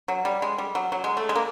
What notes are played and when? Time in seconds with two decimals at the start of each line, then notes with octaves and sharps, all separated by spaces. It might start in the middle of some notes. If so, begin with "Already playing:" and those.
0.08 F#3
0.25 G3
0.42 G#3
0.58 G3
0.75 F#3
0.92 F#3
1.04 G#3
1.17 A3
1.29 G#3
1.36 A#3